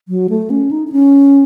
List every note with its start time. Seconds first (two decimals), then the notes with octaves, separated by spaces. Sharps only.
0.08 F#3
0.29 A3
0.50 C#4
0.71 D#4
0.87 D#4
0.92 C#4